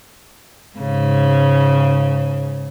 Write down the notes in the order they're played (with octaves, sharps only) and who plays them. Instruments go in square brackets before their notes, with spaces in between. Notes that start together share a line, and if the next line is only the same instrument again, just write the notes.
[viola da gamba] G#2 C#3